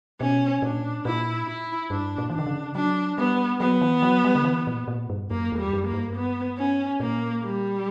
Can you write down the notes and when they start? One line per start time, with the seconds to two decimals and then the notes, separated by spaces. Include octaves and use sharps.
0.20 B2 C#4
0.62 A#2 D4
1.05 A#2 E4
1.47 E4
1.90 G2 D4
2.18 A#2
2.30 E3 D4
2.39 D3
2.46 C#3
2.75 F#3 D4
3.18 G3 B3
3.60 F#3 B3
3.81 E3
4.02 F#3
4.24 G3
4.35 D3
4.45 E3
4.67 A#2
4.88 A#2
5.10 G2
5.30 F#2 A#3
5.52 E2
5.58 G3
5.73 F#2
5.87 A#3
5.93 G2
6.15 B3
6.58 C#4
7.00 A#2 A#3
7.43 G3